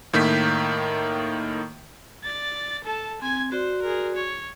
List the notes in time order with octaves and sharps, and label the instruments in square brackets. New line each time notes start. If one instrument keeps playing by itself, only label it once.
[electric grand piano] A2 D#3 A#3 G6 B6
[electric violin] D5 A6
A4 A5
[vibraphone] C4 [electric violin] G#5 G#6
[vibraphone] F#4 D5 C6 [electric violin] C5
[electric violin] G#4 A#4
C#5